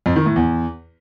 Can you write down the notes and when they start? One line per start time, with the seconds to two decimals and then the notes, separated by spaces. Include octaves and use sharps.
0.06 F2
0.16 D#3
0.26 A2
0.36 E2